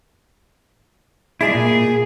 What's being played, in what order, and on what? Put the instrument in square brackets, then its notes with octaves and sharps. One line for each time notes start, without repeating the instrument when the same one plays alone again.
[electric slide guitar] G#3 D4 E4 [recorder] G#4
[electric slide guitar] A#2